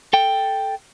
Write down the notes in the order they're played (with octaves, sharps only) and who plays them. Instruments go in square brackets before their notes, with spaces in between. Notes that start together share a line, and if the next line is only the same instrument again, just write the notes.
[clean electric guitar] A4 G5